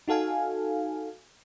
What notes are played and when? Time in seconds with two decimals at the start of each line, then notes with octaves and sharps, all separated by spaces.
0.08 D#4 F#4 A4 F5 G#5